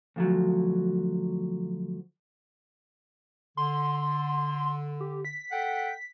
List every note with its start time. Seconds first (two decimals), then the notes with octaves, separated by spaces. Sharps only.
0.16 D2 F3 F#3
3.57 D3 C6
5.00 G4
5.25 B6
5.51 A4 F#5 G5